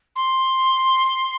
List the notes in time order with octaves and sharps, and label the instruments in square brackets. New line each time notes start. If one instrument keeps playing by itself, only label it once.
[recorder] C6